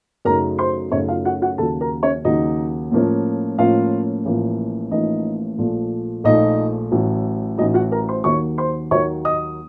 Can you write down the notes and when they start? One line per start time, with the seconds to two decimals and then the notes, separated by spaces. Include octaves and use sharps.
0.25 F#2 C#3 A3 D#4 A#4 A#5
0.58 C5 C6
0.91 F#2 C#3 A3 C#4 D#4 C#5
1.08 F4 F5
1.25 F#4 F#5
1.42 F#4 F#5
1.58 D#2 C#3 F#3 A4 A5
1.81 A#4 A#5
2.03 C#4 C#5
2.25 D#2 C#3 F#3 D#4 D#5
2.91 A2 F3 A#3 C#4
3.58 A2 F3 A#3 C#4 F4 F5
4.25 A1 A2 F3 A#3
4.91 A1 A2 F3 A#3 D#4 D#5
5.58 A#1 A#2 F3 A3
6.24 A#1 A#2 F3 A3 D#4 D#5
6.92 A1 A2 F#3
7.58 A1 A2 F#3 D#4 D#5
7.74 F#4 F#5
7.92 A#4 A#5
8.09 C5 C6
8.24 D#2 D#3 F#3 A#3 C#5 C#6
8.58 C5 C6
8.91 D#2 D#3 F#3 A#3 C#5 C#6
9.25 D#5 D#6